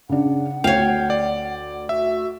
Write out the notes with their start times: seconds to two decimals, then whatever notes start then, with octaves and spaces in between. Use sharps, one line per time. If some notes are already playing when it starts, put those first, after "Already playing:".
0.09 C#3 D4 F#5
0.64 D2 C#5 F5 G5
1.10 D5
1.89 F#4 E5